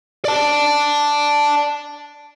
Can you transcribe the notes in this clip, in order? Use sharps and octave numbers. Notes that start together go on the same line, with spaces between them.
D5 A5